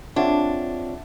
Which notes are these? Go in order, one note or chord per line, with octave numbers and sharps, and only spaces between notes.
C4 D4 F4 G#4 C#5 E5 F#5